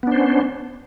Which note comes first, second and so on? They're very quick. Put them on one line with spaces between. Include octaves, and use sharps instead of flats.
B3 D4 C5 C#4